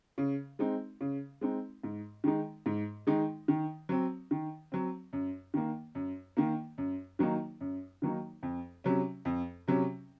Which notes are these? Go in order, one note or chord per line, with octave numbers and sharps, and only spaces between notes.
C#3
G#3 C4 D#4
C#3
G#3 C4 D#4
G#2
D#3 G#3 D#4
G#2
D#3 G#3 D#4
D#3
F#3 C4
D#3
F#3 C4
F#2
D#3 A#3
F#2
D#3 A#3
F#2
D#3 F#3 A#3 D#4
F#2
D#3 F#3 A#3 D#4
F2
C3 F#3 C#4
F2
C3 F#3 C#4